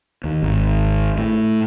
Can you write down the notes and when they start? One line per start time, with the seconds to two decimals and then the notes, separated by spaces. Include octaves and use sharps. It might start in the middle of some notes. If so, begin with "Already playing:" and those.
0.24 D#2
0.42 G#1
1.18 A2